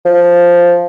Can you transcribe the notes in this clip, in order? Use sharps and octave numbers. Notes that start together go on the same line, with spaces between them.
F3